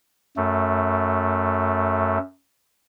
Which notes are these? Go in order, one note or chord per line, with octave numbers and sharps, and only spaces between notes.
F#2 A3